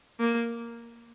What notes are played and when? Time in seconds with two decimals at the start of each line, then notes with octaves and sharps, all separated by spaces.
0.20 A#3